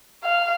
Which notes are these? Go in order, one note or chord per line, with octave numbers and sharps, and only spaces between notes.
F5